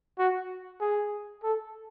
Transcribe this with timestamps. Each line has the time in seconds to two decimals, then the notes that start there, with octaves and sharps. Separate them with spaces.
0.19 F#4
0.81 G#4
1.43 A4